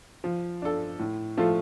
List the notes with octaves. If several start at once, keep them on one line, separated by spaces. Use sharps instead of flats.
F3
D4 A4
A2
F3 A3 F4 A4